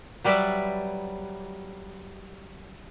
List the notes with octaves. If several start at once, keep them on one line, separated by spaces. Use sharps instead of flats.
F#3 G3 B4 D5 E5